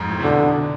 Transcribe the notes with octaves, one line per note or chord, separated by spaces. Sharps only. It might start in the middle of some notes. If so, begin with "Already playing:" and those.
Already playing: F2 G#2
A2
C3
B2 D3